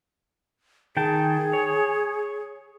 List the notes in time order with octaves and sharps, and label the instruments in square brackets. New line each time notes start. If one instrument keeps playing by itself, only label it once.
[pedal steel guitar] D#3 G5 A5 [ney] G#4
[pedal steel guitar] C#5